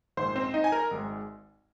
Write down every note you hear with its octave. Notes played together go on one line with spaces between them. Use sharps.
A#1 G#2 D#3 G#3 C5 C6
C4 C5
D#4 D#5
G#5
A#4 A#5
G#1 G#2 G#3